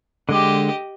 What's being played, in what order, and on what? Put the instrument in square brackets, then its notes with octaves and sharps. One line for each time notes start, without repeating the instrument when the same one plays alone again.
[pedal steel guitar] D3 G#3 D6 [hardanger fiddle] G4 D#5